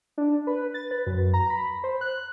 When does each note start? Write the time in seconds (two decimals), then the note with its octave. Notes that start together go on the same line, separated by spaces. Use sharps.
0.18 D4
0.47 B4
0.74 A6
0.91 B4
1.07 F#2
1.34 A#5
1.50 B5
1.84 C5
2.01 F#6